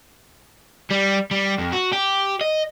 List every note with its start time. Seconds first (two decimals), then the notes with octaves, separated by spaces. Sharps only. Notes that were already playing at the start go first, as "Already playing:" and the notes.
0.91 G3
1.31 G3
1.58 F2
1.72 F#4
1.93 G4
2.41 D#5